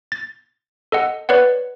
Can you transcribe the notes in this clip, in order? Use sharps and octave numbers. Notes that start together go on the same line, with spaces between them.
A6
A4 D#5 F#5
B4 C#5 D5 F#5